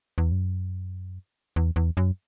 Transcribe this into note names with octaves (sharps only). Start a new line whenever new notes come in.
E2
F#2
E2
E2
F#2